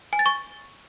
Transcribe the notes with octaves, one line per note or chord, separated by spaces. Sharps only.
G#5
A6
C#6